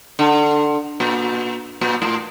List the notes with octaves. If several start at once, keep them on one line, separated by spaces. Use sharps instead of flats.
D3
A#2
A#2
A2